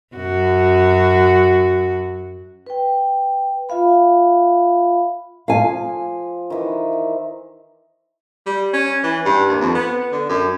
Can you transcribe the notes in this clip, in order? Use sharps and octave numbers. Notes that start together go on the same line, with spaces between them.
F#2 F#4
B4 G5
F4 E5 F5 B5
F3 F5 G#5
D#3 E3
G3
C#4
E3
G2
D#2
F2
B3
D3
F#2